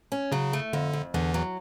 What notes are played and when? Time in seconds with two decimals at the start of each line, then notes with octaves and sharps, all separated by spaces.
0.12 C#4
0.32 C#3 F#3
0.53 A3
0.73 F2 D3
0.93 F2
1.14 E2 D3 E3
1.34 F#3